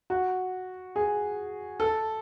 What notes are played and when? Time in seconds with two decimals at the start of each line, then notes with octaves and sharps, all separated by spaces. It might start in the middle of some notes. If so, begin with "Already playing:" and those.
0.10 F#4
0.96 G#4
1.80 A4